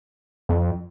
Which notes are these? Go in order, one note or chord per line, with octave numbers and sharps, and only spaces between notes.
F2